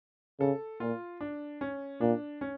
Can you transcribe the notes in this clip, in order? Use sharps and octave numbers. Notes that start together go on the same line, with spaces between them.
C#3 A4
A#2 F4
D4
C#4
A#2 D4
C#4